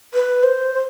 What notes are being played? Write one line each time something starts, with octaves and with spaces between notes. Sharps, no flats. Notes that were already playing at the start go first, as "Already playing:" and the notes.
B4
C5
C5